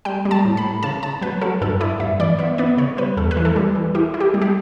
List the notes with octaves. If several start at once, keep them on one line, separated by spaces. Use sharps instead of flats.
G3 G5
G3
A5
A2
B5
A2
C#3 A5
C#3 A5
F#3 B4
F#3 A4
G2 A4
E4 D5
G2 E5
E3 D5
B3 E5
B3 D5
C#3 C#5
G3 B4
E2 A4
B4
E3
A4
G3
E3
E4 G4
E4
G4
G3
G4